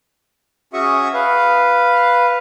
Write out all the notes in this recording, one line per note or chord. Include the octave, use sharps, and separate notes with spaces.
C#4 F#4 G#4 E5 C#6 D#6
B4 F5